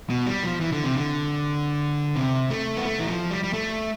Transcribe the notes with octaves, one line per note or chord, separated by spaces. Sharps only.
B2
G3
F3
E3
D3
C3
D3
C3
A3
B3
A3
E3
F3
G3
G3
A3